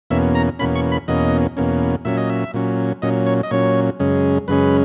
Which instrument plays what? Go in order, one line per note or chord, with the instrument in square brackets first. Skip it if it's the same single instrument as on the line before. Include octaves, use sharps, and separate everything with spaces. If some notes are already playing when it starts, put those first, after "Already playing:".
[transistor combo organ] E2 B2 A#3 C#4 E5
A#5
E2 B2 A#3 C#4 B5
C#6
B5
E2 B2 A#3 C#4 D#5
E2 B2 A#3 C#4
A#2 F#3 C#4 E5
D#5
E5
A#2 F#3 C#4
A#2 F#3 C#4 D#5
C#5
D#5
A#2 F#3 C#4 C#5
F#2 C#3 G#3 C#4
F#2 C#3 G#3 C#4 B4